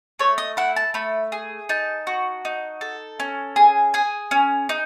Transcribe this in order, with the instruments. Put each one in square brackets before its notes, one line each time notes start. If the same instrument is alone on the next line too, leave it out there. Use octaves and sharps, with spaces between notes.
[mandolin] A3 C#5
D#5
E4 F#5
A5
A3 B5
G#4
D#4 A5
F#4
D#4
A4
C#4
G#4
G#4 G#5
C#4
D#4